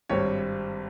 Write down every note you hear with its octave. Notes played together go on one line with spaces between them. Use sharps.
G#1 G2 G3 C4 C#5